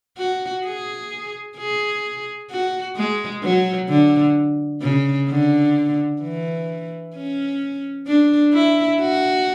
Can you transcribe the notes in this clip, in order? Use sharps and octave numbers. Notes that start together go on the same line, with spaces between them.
F#4
G#4
G#4
F#4
G#3
F#3
D3
C#3
D3
E3
C#4
D4
E4
F#4